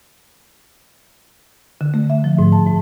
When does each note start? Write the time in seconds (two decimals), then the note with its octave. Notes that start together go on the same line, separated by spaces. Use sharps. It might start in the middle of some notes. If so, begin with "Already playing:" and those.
1.81 D3
1.94 A3
2.10 E5
2.24 F3
2.39 G#2
2.52 A5
2.67 G#2